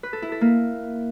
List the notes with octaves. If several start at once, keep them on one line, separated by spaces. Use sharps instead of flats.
B4
A4
E4
A4
A#3